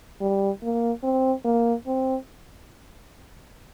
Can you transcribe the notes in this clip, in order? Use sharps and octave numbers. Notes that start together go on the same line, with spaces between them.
G3
A#3
C4
A#3
C4